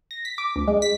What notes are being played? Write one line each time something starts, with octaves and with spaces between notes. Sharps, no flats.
A#6
B6
D6
D2
G#3
B6